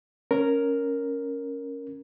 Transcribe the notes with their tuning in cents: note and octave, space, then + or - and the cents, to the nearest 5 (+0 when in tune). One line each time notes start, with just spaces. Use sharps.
C#4 +0 A#4 +0